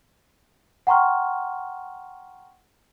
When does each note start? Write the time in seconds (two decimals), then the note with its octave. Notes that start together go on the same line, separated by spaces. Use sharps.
0.87 F#5 G5 A#5 C6 C#6 F6